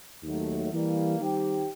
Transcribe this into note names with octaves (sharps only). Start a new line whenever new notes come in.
D#2 D#3 F#3 A3
E3 G3 A#3
D#3 G3 C4 D#4 G4